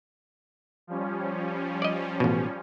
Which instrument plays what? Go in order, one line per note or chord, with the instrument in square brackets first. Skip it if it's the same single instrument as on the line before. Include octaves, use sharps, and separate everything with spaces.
[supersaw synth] F3 G3 C#4
[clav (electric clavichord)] D5 D#5
A1 B2